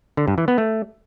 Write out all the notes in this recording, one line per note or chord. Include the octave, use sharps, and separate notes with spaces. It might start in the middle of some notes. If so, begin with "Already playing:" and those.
D3
G2
E3
B3
A3